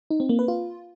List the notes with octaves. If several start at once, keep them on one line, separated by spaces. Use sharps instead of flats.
D#4
C4
A#3
B4
F4